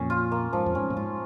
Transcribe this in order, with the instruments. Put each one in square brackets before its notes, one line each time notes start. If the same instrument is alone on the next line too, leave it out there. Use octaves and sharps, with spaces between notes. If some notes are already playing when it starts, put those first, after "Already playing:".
Already playing: [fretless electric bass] F2 A#2 [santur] C#4
[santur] F4
A#3
[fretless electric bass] G#2 [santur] F3
[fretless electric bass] F2
[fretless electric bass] G#2 [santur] C#4
[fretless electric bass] A#2
[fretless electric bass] G#2 [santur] F4